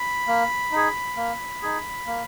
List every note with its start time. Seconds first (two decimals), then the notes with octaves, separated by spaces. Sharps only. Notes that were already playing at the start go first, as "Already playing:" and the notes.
Already playing: B5
0.28 A#3
0.72 D#4 G#4
1.17 A#3
1.62 D#4 G#4
2.07 A#3